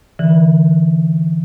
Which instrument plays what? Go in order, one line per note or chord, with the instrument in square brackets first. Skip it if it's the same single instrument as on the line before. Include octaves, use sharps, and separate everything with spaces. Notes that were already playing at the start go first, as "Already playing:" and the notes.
[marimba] D3 E3